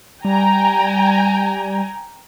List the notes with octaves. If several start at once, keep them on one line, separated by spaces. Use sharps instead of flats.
G3 G5 G#5 A#5